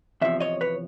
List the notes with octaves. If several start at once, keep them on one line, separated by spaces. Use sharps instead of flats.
E2 C3 F3 E5
C#5 D#5
B4 C#5